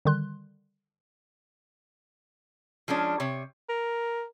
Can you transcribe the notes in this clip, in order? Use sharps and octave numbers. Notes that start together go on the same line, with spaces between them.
D3 D#3 G3 C6 F#6
F3 G#3 C#4 D4
C3 C#5
A#4